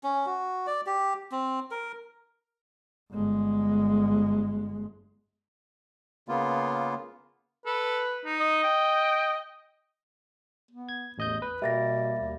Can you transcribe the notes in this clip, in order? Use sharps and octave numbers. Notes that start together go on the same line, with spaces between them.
C#4
F#4
D5
G4
C4
A#4
G1 G#3
C#3 A#3 B3 F4
A4 B4
D#4
D#5
G5
B3
G#6
A1 E2 D#5 G6
B4
B2 G3 A#3 E5 A6 A#6
D#2